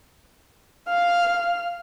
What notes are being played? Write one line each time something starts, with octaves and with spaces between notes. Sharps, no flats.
F5 F6